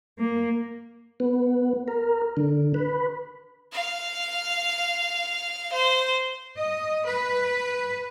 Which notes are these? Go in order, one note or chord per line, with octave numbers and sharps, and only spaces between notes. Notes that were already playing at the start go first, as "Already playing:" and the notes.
A#3
B3
A#4
D3
B4
F5
C5
D#5
B4